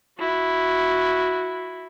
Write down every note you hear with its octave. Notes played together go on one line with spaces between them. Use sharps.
E4 F#4